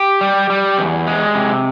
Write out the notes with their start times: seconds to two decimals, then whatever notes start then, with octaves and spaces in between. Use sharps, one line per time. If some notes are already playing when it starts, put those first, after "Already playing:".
Already playing: G4
0.21 G3
0.50 G3
0.78 E2
1.07 G#3
1.35 C3